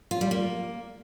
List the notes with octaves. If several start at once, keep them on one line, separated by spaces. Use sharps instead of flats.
F4
G3
A#3